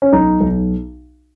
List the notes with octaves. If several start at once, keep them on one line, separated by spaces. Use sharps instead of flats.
C#4
B1 D#4
B1